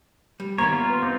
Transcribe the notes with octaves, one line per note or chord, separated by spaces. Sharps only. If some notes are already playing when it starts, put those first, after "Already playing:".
G3
D#3 A#3 B3 C#5 E5 A#5
F4
B4 C6
C4 D#4 D6